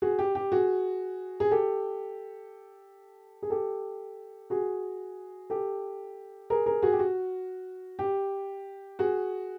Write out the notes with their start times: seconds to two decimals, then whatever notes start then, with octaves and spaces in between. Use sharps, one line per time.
0.02 F#4 G#4
0.19 G4
0.35 G4
0.52 F#4 G#4
1.40 G#4
1.51 G4 A4
3.43 G#4
3.50 G4 A4
4.50 F#4 G#4
5.50 G4 A4
6.50 G#4 A#4
6.66 G#4 A#4
6.83 F#4 G#4
6.92 G4
6.99 F#4
7.99 G4
8.99 F#4 G#4